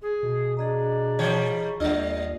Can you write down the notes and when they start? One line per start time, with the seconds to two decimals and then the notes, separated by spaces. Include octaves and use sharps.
0.01 G#4
0.23 B2
0.57 D4 G#4 D#5 A#5
1.19 E3 G3 C#5
1.80 D#2 G3 D4 F4 D5 D#5